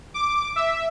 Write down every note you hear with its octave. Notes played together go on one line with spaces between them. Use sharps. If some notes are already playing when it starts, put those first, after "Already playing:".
D6
E5